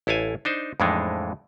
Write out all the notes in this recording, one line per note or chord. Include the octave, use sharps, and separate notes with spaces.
A1 E4 A4 F5 G#5
D4 D#4 C5
F2 A2 E3 G#3 D4 D#4